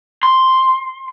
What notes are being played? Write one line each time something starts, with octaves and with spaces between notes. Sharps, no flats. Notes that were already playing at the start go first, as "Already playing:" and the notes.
C6